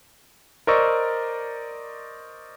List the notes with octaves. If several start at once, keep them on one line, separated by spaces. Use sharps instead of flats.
A#4 C5 D5 D#5 C#6 E6